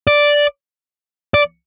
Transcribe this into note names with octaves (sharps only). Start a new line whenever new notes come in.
D5
D5